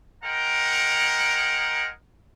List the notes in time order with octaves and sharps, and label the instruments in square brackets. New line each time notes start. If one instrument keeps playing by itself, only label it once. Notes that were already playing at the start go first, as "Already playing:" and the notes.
[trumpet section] G#3 A#4 F#5 G5 A#5